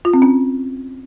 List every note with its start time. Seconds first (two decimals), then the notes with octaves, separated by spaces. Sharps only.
0.05 F4
0.13 C4
0.22 C#4